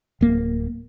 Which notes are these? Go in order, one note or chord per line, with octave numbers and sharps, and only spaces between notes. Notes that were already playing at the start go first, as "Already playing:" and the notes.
D1 A#3